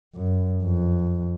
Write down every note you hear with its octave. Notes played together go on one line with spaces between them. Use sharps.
F#2
F2